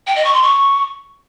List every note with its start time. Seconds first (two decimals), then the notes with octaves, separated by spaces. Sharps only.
0.07 G5
0.16 D#5
0.25 C#6
0.34 C6
0.43 C#6